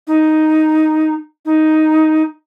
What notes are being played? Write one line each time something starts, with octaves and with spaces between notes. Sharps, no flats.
D#4
D#4